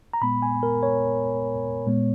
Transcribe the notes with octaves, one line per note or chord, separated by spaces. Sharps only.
A#5
A#2 G#3 B3 B5
G#5
A#4
C#5
A#2 G#3 B3